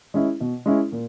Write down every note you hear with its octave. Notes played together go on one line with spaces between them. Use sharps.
G#3 C#4 E4
B2
G#3 C#4 E4
A#2